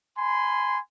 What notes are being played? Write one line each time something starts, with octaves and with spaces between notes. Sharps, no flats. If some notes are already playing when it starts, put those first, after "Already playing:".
G#5 B5 C6